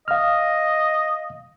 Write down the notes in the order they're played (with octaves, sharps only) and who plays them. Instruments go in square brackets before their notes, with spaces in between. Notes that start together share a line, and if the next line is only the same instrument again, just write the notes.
[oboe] D#5 [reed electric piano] F5 F6